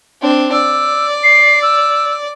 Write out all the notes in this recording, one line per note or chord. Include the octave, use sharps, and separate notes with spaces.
C4 D4
D5 E6
C7
E6